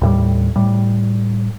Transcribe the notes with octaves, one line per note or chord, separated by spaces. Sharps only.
D#2 A2 G3
A2 G3